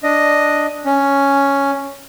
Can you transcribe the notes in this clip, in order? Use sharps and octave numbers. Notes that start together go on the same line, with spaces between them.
D4 D#5
C#4